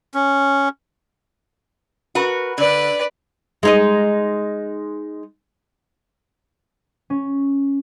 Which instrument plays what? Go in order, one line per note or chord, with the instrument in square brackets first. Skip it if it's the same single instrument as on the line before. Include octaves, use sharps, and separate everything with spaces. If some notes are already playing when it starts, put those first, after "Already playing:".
[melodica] C#4
[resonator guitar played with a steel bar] F#4 A#4 B4
[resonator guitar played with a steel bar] D3 [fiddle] B4 D5
[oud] G#3 D#4 D#5
[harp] C#4